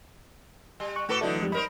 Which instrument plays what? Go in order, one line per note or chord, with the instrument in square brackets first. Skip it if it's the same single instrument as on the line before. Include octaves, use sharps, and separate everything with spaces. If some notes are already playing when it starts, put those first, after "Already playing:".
[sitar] G3
[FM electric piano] C#6 F#6
[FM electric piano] A2 D6 [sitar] F#4 A4 B4
[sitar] D3 D4 D#4 [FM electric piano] E3 F#3 A3
[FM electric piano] F2 G#2 G3
[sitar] D#4 A#4 C5 [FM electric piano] B5